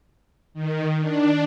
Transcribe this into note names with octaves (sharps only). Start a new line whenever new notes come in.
D#3
D4